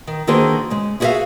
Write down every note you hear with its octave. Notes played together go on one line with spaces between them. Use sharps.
D#3
D3 D#3 A#3 F#4 G#4 C5
C#3 G#3
E4 F#4 G#4 C#5 E5 F5